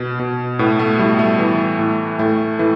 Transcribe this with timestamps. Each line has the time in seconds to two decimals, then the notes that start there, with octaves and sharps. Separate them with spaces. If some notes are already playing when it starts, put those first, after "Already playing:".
Already playing: B2
0.20 B2
0.59 A2 B3
0.79 A3
0.99 A2 G3
1.19 A3
1.39 E3
1.79 A2
2.19 A2 A3
2.59 E3 A3